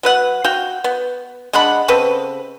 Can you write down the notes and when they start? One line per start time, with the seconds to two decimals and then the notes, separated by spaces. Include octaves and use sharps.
0.03 F#3 B4 F#5
0.44 F#4 F5 G5
0.84 B3
1.53 G#3 D4 F#5 B5
1.88 C#3 C4 A4 B4